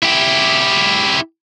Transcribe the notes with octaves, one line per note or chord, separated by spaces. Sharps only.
E4 G4